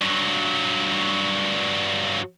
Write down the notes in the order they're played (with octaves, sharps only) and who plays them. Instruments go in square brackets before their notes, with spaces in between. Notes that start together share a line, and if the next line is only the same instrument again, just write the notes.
[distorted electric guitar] G2 F#3